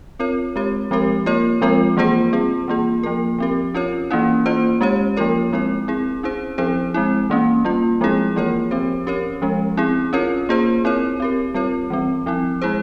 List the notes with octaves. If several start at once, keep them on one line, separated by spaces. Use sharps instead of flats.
C4 F4 A#4 C#5
G#3 C4 G4 C#5
F3 G#3 C4 G4 A#4
A#3 F4 A#4 C#5
F3 G#3 C4 F4 A#4
E3 A#3 F4 G#4 C5
G3 C4 F4 G#4
E3 A#3 F4 G#4
F3 A#3 F4 A#4
F3 C4 G4 A#4
C#4 F4 A#4 C#5
E3 A#3 C#4 E4
E3 A#3 F4 C5
G#3 C#4 G4 C#5
F3 A#3 F4 A#4 C#5
G#3 C4 E4 A#4
C4 E4 G#4
C#4 E4 G#4 C5
F3 C4 E4 G#4 C5
G#3 C4 E4
E3 A#3 C#4
G3 A#3 F4
F3 G#3 C4 E4 G#4
E3 A#3 F4 A#4 C#5
F3 C4 G4 C5
C#4 G4 A#4 C#5
F3 G#3 C#4
C4 E4 G#4
C#4 F4 A#4 C#5
A#3 F4 G#4 C5
C4 E4 A#4 C#5
C4 G4 A#4
G3 C4 F4 A#4 C#5
E3 G3 C4
F3 C4 E4
G#3 E4 G#4 C5